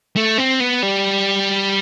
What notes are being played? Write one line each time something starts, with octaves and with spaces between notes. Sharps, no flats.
A3
C4
B3
G3